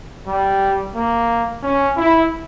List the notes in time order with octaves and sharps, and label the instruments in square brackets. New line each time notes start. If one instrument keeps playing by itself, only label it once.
[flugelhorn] G3
A#3
C#4
E4